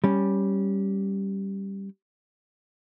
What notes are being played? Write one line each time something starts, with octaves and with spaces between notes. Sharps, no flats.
G3 C#4